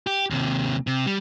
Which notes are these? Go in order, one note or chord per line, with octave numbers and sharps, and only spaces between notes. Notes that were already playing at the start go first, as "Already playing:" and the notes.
G4
D#2 C3
C3
G3